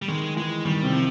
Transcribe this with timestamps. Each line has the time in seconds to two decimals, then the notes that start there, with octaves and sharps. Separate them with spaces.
0.02 G3
0.08 D#3 G#3
0.36 E3 G#3
0.65 D#3 G3
0.83 C3
0.93 F3